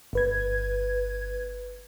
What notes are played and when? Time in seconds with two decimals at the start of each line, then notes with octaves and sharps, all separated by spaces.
0.13 G1 B4 G#6